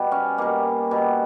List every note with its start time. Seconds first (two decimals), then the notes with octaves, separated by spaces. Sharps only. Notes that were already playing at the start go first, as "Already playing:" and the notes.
Already playing: B2 G3
0.12 C#4
0.38 B2 G3 A#3
0.91 B2 G3